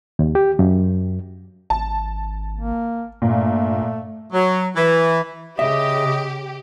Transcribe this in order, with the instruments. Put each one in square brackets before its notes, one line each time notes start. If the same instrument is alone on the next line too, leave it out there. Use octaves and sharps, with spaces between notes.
[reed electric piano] D#2
G4
F#2
[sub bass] G#1 [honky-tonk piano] A5
[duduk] A#3
[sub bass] G2 [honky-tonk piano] A#2 [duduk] A3
[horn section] F#3
E3
[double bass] C#3 [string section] G4 [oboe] D#5 [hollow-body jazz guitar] E5